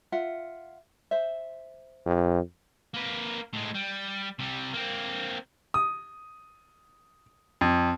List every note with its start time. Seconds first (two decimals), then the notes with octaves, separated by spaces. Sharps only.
0.12 F4 E5 F#5
1.11 C5 E5
2.06 F2
2.94 A#3 B4
3.53 A2 G#3
3.74 G3
4.39 C3 G3
4.73 A#3 C4
5.74 D#6
7.61 F2